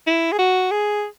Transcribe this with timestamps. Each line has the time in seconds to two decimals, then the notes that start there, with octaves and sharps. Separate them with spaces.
0.07 E4
0.32 G#4
0.39 F#4
0.71 G#4